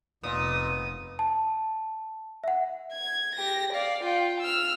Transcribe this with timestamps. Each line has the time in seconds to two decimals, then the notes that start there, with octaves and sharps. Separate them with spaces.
0.23 F1 A#2 B3 D#4 D#6
1.19 A5
2.44 E5 F#5
2.93 G#6
3.36 G4 A#6
3.73 D5 F5
4.04 F4 G5
4.41 E6 F6